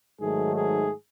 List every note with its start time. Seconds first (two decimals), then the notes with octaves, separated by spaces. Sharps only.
0.20 G#2 D#3 F#3 A3 G#4
0.55 G#4